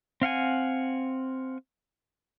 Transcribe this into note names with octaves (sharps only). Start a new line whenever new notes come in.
C4 F5 F#5 G#5